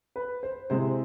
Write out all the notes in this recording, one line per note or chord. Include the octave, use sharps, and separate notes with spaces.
B4
C5
C3 G#3 C4 E4 C5